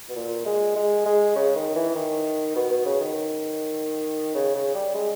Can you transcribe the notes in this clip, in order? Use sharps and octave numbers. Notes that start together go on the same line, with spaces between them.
B2
A#2
G#3
G#3
G#3
C#3
D#3
E3
D#3
B2
B2
C#3
D#3
C#3
C#3
G3
G#3